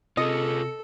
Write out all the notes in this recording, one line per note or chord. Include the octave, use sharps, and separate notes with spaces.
C3 F4 G#4 A4 D#5 A#6 C#7